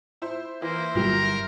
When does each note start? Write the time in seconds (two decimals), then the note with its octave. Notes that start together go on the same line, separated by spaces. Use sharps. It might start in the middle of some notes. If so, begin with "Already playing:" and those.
0.22 E4 C5
0.62 E3 A#3 C5 E5
0.95 G1 C2 F#3 G3 G4 A#4